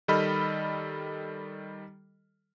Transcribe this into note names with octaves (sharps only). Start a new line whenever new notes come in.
D#3 G3 A4 D#5 B5 F6